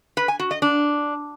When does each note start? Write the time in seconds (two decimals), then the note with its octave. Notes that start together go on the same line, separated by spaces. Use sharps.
0.17 B4
0.28 G#5
0.39 F#4
0.51 D#5
0.62 D4